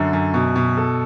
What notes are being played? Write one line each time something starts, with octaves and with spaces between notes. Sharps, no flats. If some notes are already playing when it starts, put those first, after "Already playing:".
Already playing: F#2 D3
F#2
B2
B2
A4